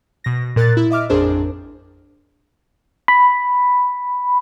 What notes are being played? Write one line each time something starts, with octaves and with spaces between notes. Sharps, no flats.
B2 A#6
A#2 A#4 F#6 A6
E4
D#5 E5 D6 F6
A1 F2 D4 G#4 A#4 C5
B5